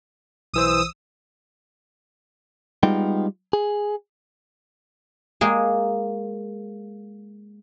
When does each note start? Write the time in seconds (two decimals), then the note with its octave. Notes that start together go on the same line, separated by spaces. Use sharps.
0.54 B1 E3 C5 D#6 E6
2.83 G3 G#3 B3 D#4 F4 G5
3.53 G#4
5.41 G#3 A#3 G#4